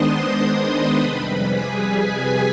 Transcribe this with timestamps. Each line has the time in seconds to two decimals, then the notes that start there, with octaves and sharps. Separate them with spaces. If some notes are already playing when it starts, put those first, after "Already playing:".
Already playing: D#3 G#3 B3 D4 C5 D#5 C6 D#6
0.54 B4 B5
0.96 F2 C3 G3
1.38 G#4 G#5
2.22 B4